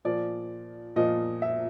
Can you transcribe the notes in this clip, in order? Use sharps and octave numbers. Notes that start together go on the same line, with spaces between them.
A#2 F3 D5
A#2 F3 D#5
E5